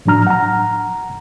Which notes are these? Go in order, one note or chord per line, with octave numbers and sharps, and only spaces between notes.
A2 F3 F#3 D4 A#5 F6
F#5 A#5